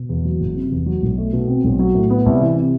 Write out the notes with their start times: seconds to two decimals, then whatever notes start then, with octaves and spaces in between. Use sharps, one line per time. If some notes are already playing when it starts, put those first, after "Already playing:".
Already playing: B2
0.09 E2
0.25 F#3
0.40 F#1
0.55 C3
0.72 E2
0.86 F#3
1.02 B1
1.18 A3
1.33 B2
1.48 C4
1.64 B1
1.79 F#3
1.95 A2
2.10 B3
2.26 C2
2.41 E3
2.56 C3